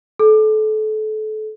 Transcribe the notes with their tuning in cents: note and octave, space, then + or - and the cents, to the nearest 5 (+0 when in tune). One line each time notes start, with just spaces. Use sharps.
A4 -30